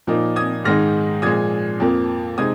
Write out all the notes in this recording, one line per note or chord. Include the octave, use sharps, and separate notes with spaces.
A#2 F3 A#3 D#4
D#6 G#6
G#2 D#3 G#3 D#4 F6 A#6
A#2 F3 G#3 D#6 G#6
F2 F3 A#3
C3 G#3 C4 D#4 D#6 G#6